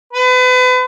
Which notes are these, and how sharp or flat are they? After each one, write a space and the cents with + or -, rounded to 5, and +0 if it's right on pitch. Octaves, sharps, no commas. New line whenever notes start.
B4 +35